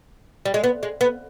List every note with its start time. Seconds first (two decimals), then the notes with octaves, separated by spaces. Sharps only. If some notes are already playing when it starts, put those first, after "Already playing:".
0.46 G3
0.54 G#3
0.64 B3
0.83 G#3
1.01 B3